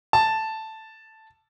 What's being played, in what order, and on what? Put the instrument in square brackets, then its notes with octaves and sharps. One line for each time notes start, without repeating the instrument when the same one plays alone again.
[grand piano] A5